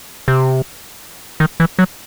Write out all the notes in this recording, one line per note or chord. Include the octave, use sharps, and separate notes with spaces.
C3
D#3
E3
F#3